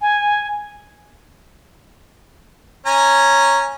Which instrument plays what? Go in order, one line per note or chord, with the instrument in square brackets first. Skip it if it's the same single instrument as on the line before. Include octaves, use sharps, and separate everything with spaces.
[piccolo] G#5
[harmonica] C#4 G#5 A#5